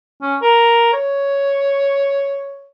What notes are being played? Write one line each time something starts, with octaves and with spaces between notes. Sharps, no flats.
C#4
A#4
C#5